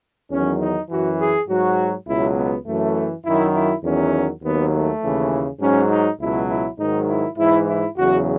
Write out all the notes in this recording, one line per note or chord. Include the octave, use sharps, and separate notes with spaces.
E2 D#3 F#3 C#4
D#4
F#2 E3 F#4
G#4
G#2 F#3 F#4
C#2 B2 F#3 E4
B3
F#2 E3 A3
F#2 D#3 F#3 E4
E4
E2 D#3 F#3 C#4
D#2 D#3 F#3 B3
A3
D#2 C#3 E3
G#2 F#3 C#4
D#4
C#2 B2 F#3 E4
E4
G#2 D#3 F#3 D#4
E4
G#2 E3 E4
E4
E2 C#3 F#3 F#4